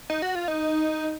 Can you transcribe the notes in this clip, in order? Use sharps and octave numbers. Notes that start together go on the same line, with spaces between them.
D#4
F#4
F4
D#4